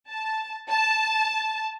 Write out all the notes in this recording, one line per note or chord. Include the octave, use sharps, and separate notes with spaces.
A5
A5